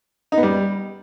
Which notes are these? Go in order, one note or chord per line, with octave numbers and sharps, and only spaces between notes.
D#4
B3
G3